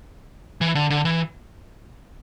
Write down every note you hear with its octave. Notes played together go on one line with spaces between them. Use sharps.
E3
D3
D3
E3